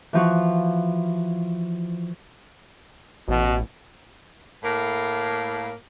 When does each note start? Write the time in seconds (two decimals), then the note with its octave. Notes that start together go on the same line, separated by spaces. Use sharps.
0.13 E3 F3 F#4
3.28 A1 B2
4.63 A2 A#3